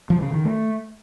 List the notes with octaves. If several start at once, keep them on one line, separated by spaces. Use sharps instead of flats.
F3
C#3
D#3
A3